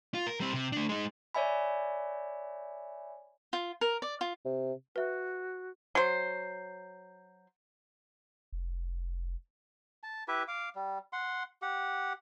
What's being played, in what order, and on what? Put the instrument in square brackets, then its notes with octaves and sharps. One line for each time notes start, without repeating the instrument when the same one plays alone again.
[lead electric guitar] F4
A#4
G3 C4
C3
A3 D4
G#3 D#4
[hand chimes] C#5 D5 E5 G#5 B5
[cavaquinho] F4
A#4
D5
F4
[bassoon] C3
[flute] F#4 [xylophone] B4 E5
[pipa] F#3 C5
[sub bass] F1
[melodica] A5
E4 G4 B4 E5
F5 D6
G3
F#5 C6
G4 F#5